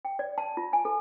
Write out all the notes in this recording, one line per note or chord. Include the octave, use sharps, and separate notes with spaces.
G5
D5
A5
F4
G#5
A4